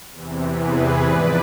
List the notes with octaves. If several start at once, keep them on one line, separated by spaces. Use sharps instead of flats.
E2 C3 E3
G#4 B4
G#2 F3 B4 D5